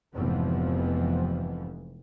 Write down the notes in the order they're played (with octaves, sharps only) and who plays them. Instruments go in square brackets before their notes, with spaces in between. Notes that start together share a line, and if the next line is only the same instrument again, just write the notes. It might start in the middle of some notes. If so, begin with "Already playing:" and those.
[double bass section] F1 F2 G#2 E3 F3 B3